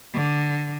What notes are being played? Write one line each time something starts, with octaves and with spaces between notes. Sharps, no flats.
D3